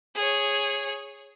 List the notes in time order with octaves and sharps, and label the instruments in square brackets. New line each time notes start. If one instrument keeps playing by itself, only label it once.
[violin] G#4 C#5